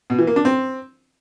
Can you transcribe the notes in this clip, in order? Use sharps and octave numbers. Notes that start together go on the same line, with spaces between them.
B2
E3
A#3
D4
C4